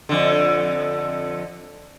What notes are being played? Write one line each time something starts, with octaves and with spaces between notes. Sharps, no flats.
F2 D3